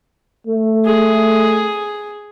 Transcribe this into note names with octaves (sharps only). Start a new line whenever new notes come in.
A3
G#4